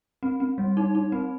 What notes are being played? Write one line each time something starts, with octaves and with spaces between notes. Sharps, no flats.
C4
C4
G3
D#4
D#4
C4